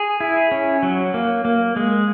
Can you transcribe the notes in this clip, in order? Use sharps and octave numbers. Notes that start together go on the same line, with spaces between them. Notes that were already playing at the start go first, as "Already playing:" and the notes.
Already playing: G#4
E4
C#4
F#3
A#3
A#3
G#3